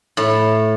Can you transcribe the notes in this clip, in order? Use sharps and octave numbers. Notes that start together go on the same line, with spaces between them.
A2